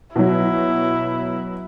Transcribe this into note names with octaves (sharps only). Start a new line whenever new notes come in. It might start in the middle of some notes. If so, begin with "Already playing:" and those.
B2 F#3 E4